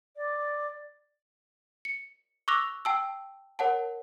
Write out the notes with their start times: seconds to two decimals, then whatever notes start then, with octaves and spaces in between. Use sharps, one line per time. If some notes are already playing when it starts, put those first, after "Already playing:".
0.17 D5
1.85 C#7
2.48 C#6 D6 E6 F#6 A#6 F7
2.85 G5 A5 E6
3.59 A#4 C#5 F#5 A5